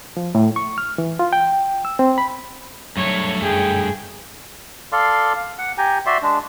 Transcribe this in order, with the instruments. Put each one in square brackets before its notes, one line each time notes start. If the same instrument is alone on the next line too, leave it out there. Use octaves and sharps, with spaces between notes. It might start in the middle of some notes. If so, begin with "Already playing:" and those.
[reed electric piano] F3
A2
C#6
F6
E3
F4
G5
E6
C4
B5
[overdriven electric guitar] G2 A3 [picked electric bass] F#3 [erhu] C#5
[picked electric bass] F#2 [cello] G#4 [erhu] G5
[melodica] A4 D5 F5 C6
F5
F#5
G4 G5 G#5 A#5
F#4 D5 E5 C6
G#3 D4